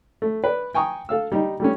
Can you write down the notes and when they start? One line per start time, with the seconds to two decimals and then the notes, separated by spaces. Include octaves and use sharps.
0.22 A3
0.44 B4 D5
0.74 G5 G#5 A#5 C#6 D#6
1.09 A4 F5 E6
1.32 G3 D#4
1.60 G3 A3 C#4